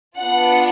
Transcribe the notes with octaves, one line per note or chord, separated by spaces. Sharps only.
B3 D4 F4 F#5